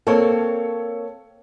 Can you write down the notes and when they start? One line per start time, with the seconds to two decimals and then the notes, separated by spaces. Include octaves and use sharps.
0.07 A#3 C4 A4 C#5 A5